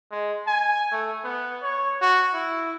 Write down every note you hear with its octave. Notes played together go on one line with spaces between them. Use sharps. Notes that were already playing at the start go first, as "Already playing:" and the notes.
G#3
G#5
A3
B3
C#5
F#4
E4